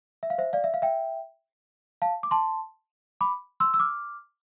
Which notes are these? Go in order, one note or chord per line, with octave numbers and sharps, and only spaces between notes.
E5
F5
C5 E5
D5 F5
E5
F5
E5 G5
F5 A5
D6
A5 C6
B5 D6
C6 E6
E6
D6 F6